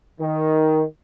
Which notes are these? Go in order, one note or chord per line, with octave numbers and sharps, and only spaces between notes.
D#3